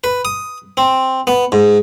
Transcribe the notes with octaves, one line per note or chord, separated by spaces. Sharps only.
B4
D#6
C4
B3
G#2